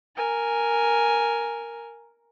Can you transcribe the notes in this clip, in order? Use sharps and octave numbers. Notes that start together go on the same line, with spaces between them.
A#4 G#5